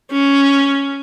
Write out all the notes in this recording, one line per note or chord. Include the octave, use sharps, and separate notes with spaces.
C#4